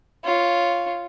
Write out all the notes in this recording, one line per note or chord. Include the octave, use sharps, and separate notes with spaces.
F4 C#5